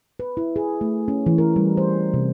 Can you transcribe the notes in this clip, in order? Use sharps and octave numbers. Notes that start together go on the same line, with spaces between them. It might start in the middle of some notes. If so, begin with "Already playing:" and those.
B4
E4
G#4
A3
C#4
E3
A#4
G3
C5
C3